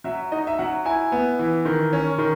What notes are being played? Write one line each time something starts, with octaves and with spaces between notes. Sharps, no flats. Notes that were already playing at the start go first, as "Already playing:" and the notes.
F#3 E5
D#4 D#5
E5
F#3 F#5
E4 G#5
B3
E3
D#3
C#4
D#3